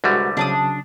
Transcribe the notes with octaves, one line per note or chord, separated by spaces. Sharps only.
C2 D3 G3 G#3 F#4 B4
C#3 F#3 D4 A5 D#6